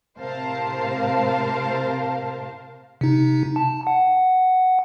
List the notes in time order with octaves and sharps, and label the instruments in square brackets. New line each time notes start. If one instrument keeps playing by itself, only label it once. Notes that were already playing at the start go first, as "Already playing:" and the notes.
[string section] A2 C3 A#4 C5 F5 A5
[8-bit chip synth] C3 D#4
A5
F#5